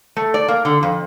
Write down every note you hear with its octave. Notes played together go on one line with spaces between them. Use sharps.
A3
D5
A#3
D3
F2